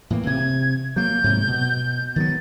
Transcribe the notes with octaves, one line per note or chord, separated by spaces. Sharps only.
A2 E3 A#3
C3 G#6
F#3 A#3 G6
G#2 C3 F#3
B2
D#3 F#3 B3 A6